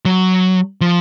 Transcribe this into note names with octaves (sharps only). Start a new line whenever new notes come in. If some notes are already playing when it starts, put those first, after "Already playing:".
F#3
F3